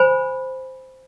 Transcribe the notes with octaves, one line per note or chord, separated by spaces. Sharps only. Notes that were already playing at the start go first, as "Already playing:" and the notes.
Already playing: C5 G#5 B5